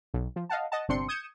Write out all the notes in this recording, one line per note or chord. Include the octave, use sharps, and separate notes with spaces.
B1
F3
D#5 F5 F#5 A5
D#5 F#5 A5
G1 C3 C4 D4 C6 C#7
D#6 G6 G#6 C#7 D#7 E7